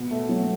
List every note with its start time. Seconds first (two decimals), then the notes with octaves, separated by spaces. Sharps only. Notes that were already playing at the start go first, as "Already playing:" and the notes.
Already playing: B2
0.11 A3
0.29 F#3